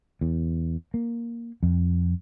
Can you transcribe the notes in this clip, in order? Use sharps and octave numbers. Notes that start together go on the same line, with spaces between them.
E2
A#3
F2